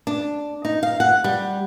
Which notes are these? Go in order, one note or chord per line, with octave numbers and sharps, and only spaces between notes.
D4
D#4
F5
F#5
G3